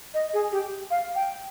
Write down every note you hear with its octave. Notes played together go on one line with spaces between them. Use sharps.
D#5
G#4
G4
F5
G5